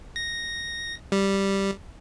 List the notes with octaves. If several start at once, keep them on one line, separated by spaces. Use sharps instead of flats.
A#6
G3